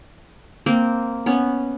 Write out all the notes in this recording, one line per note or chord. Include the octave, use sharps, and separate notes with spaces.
A#3 C4
B3 C#4